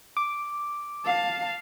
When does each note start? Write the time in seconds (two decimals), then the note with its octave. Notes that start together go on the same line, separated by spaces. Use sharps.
0.17 D6
1.05 F5 A5